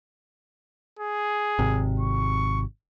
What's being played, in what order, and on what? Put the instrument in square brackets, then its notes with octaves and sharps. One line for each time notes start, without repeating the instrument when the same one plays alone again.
[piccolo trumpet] G#4
[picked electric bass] G#1 C3
[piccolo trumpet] C#6